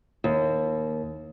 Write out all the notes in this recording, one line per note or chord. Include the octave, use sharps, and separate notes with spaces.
D#2